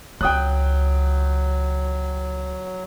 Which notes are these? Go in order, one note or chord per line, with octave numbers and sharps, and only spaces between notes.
C#2 F#3 G5 D#6 F#6